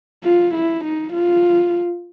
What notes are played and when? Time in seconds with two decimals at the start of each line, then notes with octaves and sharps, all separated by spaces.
0.24 F4
0.54 E4
0.84 D#4
1.13 F4